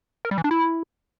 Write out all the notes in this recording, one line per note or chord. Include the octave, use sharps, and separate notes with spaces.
A#4
G3
E3
D4
E4